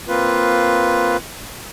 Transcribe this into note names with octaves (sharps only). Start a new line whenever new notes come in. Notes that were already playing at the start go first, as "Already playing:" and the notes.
A#3 C4 F4 B4